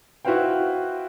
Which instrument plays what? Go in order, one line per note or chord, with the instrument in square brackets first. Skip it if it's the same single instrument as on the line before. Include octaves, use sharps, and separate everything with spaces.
[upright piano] E4 F#4 B4 C5 F5 G5